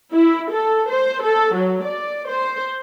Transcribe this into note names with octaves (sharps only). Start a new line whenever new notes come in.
E4
A4
C5
A4
F#3
D5
C5